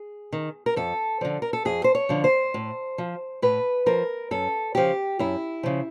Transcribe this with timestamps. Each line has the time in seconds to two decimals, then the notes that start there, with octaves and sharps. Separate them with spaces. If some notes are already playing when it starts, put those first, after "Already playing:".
Already playing: G#4
0.33 D#3
0.66 A#4
0.76 F2 A4
1.21 D3 F3
1.42 A#4
1.53 A4
1.65 F2 G#4
1.84 C5
1.95 C#5
2.09 D3 F3
2.24 C5
2.54 A2
2.98 F3
3.42 A2 B4
3.86 F3 A#4
4.31 F#2 A4
4.75 C#3 F3 G4
5.19 F#2 E4
5.63 C#3 F3